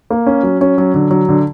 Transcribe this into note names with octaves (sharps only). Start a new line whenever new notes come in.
A#3
C#4
F#3
C#4
F#3
D3
F#3
D3